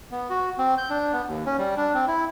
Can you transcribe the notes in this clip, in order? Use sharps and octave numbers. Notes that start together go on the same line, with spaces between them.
B3
F#4
C4
G6
D4
B3
D#2
C#4
G3
D4
C4
E4